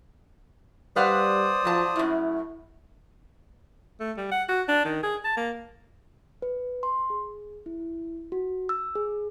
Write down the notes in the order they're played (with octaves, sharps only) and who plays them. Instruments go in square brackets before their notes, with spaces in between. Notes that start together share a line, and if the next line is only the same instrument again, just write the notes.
[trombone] G3 [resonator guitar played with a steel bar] B4 F5 F#5 [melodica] C5 D5 D#6
[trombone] F3 [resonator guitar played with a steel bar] F#3 A5
[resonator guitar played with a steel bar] F#2 A2 [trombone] E4
[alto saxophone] A3
G3
F#5
F#4
D4
D#3
G#4
A5
A#3
[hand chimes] B4
C6
G#4
E4
F#4
E6
G#4